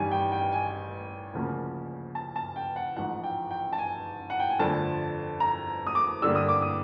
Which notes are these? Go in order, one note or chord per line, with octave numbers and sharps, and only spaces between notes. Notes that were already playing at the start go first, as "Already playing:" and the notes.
Already playing: A1 G2 D#3 G3 G#5
G5
G5
G#5
D2 C#3 F3 A#3 C#4
A5
A5
G5
F#5
A1 G#2 F3 F#5
G5
G5
A5
G#5
F#5
G5
G#5
G1 F2 D3 F3 A3 A5
A#5
D#6
D6
G2 D3 G3 A#3 E6
D#6
D6
D#6